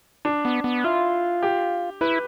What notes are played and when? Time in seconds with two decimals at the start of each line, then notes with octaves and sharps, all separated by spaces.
0.25 D4
0.45 B3
0.64 B3
0.84 E4 F4
1.43 G4
2.01 E4 B4